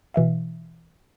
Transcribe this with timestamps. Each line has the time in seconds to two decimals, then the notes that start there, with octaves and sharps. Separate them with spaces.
0.14 B2 E3 E5 F5